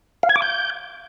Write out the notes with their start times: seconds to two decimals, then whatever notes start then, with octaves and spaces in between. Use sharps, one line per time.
0.23 F5
0.29 G#6
0.36 D6
0.42 G6